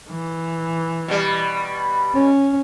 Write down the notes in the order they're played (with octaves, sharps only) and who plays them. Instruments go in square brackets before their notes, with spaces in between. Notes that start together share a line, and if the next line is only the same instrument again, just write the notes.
[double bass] E3
[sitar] B2 G3
[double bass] C#4